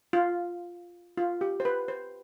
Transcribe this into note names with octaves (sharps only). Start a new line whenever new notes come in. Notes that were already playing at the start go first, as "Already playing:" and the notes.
F4
F4
G4
C5
B4
C5